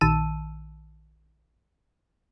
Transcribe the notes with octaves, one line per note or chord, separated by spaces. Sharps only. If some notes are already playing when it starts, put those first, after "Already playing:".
A#1 D#3 A5 E6 D#7